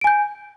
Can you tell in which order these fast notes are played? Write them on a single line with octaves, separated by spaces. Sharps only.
D7 G#5 G6